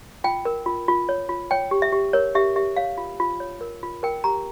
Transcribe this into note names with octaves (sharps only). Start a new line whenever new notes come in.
F4 G5
A#4
F4
F4
C#5
F4
C#5 G5
G4
E5
G4
A#4 C#5
G4 E5
G4 E5
C#5 F5
F4
F4
C#5
A#4
F4
A#4 G5
G4 A#5